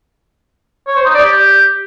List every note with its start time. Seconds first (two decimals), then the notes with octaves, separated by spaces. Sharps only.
0.87 C#5
0.96 C5
1.05 D#4
1.14 D5
1.23 G4